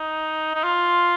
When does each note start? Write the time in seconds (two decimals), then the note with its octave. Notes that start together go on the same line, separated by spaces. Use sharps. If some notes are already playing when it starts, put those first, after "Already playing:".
Already playing: D#4
0.55 D#4
0.64 F4